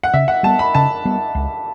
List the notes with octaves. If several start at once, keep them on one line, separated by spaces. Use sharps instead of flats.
F#5
C#3 E5
F#5
G3 B3 A5
B5
C#3 A5
G3 B3
C#2